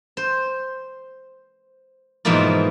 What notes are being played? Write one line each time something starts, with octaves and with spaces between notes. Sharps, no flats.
C5
G#2 B2 E3 F3 A#3 F4